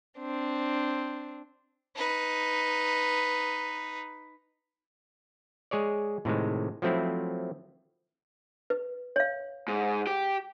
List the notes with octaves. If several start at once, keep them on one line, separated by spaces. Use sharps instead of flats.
C4 D4
D#4 B4
G#3 G#4 C#5 D5
A2 C3 D#3 G#3
F3 F#3 A3 C4 E4
B4
C#5 F5
G#2
G4